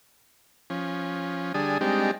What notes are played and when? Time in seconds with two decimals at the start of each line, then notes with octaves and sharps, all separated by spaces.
0.70 F3 C#4
1.54 D3 G3 D4 G#4 D#6
1.81 G3 G#3 C4 D4 D#4 G4